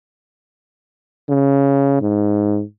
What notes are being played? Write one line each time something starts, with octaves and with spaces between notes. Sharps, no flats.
C#3
G#2